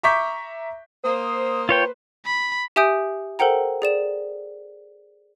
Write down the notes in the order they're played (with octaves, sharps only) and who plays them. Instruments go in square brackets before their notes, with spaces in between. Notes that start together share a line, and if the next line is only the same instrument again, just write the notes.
[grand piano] E5 A#5 C#6 D6 G6 B6
[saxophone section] A#3 C5 [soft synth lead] D#6
[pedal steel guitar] F4 C#5 G5 [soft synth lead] B4
[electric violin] B5
[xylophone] G4 E5 G#5 D#6 G6 D7
A4 A#4 C5 F#5 G5 A#5
G#4 D5 E7